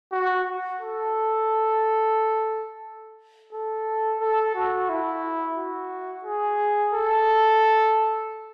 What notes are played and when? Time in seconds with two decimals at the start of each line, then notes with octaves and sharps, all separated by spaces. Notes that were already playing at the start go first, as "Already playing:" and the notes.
0.12 F#4
0.80 A4
3.53 A4
4.20 A4
4.55 F#4
4.89 E4
5.57 F#4
6.25 G#4
6.93 A4